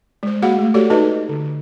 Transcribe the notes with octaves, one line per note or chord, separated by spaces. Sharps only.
G#3 C5
A#3 F#4 G#4 F5 F#5 B5
A3
F#4 G4 A4 C#5 D5
D#4 F#4 A4 B4 D#5
D3